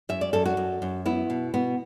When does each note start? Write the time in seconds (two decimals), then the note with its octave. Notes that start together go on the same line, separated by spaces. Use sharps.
0.09 F#2 E5
0.21 D5
0.33 F#2 A4
0.46 F#4
0.57 F#2
0.82 F#2
1.05 B3 E4
1.30 B2
1.54 B2 B3